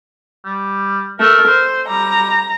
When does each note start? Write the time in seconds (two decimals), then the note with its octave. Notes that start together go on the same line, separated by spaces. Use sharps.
0.45 G3
1.20 A3 A#4
1.48 C5
1.89 G3 A#5